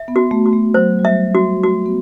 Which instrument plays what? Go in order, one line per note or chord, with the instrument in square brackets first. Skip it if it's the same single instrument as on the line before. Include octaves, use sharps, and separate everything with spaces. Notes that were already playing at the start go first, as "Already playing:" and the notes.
Already playing: [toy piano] E5
[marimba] B3
[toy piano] F#4
[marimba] A3
[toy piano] F#4
[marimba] A3
[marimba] F#3 [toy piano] C5
[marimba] G3
[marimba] F#3 [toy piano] E5
[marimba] G3 [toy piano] F#4
[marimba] A3 [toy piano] F#4
[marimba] B3